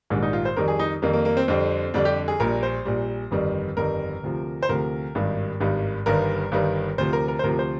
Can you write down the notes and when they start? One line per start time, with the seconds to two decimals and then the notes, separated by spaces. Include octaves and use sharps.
0.10 A#1 G#2 D#3 G3 D4
0.22 D#4
0.33 F4
0.45 C5
0.56 F2 D#3 G3 A#4
0.68 G#4
0.80 D#4
1.02 F2 D#3 G3 A#3
1.13 A#3
1.25 A#3
1.37 C4
1.48 F2 D3 G3 C4
1.94 F2 D3 G3 D4
2.05 G4
2.28 G#4
2.40 A#1 A#2 G3 A#4
2.63 C5
2.85 A#1 A#2 G3
3.31 G1 F2 D#3 G3
3.77 G1 F2 D#3 G3 A#4
4.23 D2 C3 F3
4.63 C5
4.69 D2 C3 F3 A#4
5.15 G#1 G2 D#3 G3
5.60 G#1 G2 D#3 G3
6.06 G1 G2 D#3 G3 A#4
6.52 G1 G2 D#3 G3
6.98 D2 C3 F3 C5
7.13 A#4
7.28 A#4
7.39 C5
7.44 D2 C3 F3 A#4
7.59 C5